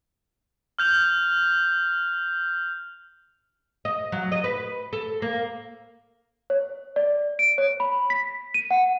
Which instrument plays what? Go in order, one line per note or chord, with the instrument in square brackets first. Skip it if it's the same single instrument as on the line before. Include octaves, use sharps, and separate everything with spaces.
[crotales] F6 G6 F7
[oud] D#5
F#3
D#5
B4
A4
A#3
[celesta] C#5
D5
D7
C#5
B5
B6
D#7
F#5